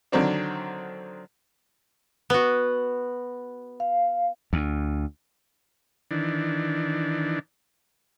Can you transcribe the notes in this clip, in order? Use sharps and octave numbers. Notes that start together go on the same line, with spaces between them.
D3 D#3 F#3 C4 D4
B3 F#4
F5
D2
D#3 E3 D4